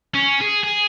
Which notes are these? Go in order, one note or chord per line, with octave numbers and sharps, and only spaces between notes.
C#4
G#4
G#4